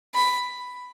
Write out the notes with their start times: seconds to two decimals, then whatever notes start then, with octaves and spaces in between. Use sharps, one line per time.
0.15 B5